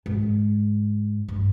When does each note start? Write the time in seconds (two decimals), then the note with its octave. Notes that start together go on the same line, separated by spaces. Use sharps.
0.06 G#2
1.28 G2